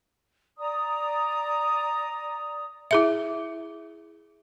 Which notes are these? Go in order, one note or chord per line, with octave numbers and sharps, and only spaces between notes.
D5 A#5 D#6
E4 G#4 E5